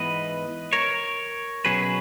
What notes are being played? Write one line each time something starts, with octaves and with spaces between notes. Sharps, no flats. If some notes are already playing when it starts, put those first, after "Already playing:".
Already playing: G#2 E3 B3 B4 D#5
A#4 C#5
B2 F#3 C#4 G#4 B4